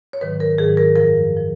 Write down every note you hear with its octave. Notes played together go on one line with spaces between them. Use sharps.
C#5
G#2 D#3 F#3 B4
A#4
G#2 D#3 F#3 G#4
A#4
F#2 F3 A#4
F3